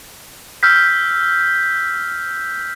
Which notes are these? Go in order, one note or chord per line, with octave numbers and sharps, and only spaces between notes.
E6 F6 G6 B6